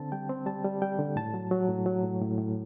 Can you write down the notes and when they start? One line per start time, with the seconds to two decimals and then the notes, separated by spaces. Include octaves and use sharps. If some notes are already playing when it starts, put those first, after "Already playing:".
Already playing: D3 C4 A5
0.12 G3 G5
0.29 C4
0.46 G3 A5
0.64 G3
0.82 G3 G5
0.99 D3
1.16 A2 A5
1.34 F#3
1.51 F#3
1.69 A2
1.86 F#3
2.03 A2
2.21 A2
2.38 A2